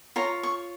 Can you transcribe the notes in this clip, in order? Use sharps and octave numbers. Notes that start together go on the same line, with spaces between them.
F4 C#5 A#5
C#6